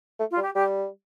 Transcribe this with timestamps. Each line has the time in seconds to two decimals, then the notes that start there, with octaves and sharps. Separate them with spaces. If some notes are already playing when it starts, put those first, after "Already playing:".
0.19 A3
0.31 F4
0.37 G3
0.43 G4
0.55 G3 G4